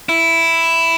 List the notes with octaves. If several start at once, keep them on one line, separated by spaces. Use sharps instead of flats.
E4